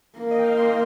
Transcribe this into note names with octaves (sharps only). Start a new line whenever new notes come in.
A#3
D#5
G5
F5
C6